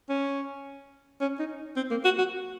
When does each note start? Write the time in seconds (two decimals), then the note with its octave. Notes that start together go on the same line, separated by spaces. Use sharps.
0.09 C#4
1.21 C#4
1.39 D#4
1.77 C4
1.91 A#3
2.05 F#4
2.18 F#4